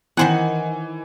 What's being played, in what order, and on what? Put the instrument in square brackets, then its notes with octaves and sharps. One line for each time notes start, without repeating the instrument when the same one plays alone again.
[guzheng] D#3 C5 F#5 [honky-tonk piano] E3 G#5 F#7